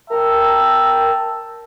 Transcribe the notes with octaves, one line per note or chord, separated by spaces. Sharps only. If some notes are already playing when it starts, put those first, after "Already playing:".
A#4 E5 G5 A5